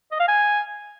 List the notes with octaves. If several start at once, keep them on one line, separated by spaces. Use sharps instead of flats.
D#5
F5
G#5